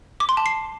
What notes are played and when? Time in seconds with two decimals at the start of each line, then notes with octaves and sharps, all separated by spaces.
0.20 D6
0.29 C6
0.37 A5
0.46 C7